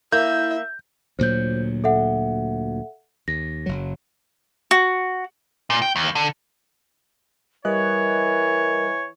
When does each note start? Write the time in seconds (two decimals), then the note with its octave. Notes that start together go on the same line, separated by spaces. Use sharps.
0.12 A#3 E4 E5 G6
1.19 D2 A#2 F#3 C5 G6
1.84 A4 E5 F#5
3.28 D#2 A#6
3.66 F#1 F#3
4.71 F#4
5.70 A#2
5.82 G5
5.96 D#2
6.15 D3
7.65 E3 G3 A#4 C#5 D#5 F#6